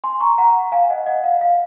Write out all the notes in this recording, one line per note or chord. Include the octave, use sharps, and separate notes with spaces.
G#5 C6
A#5 C#6
F#5 A#5
F5 G#5
D#5 F#5
D#5 F#5
F5
F5